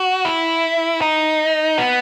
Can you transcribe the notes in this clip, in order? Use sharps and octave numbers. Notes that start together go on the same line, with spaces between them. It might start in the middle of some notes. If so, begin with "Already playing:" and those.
Already playing: F#4
E4
D#4
B3